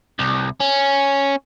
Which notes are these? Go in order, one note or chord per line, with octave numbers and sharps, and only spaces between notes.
C2
C#4